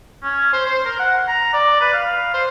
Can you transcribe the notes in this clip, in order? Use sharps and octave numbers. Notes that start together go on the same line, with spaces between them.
C#4
C5
C5
A#4
F#5
A#5
D5
B4
F5
C5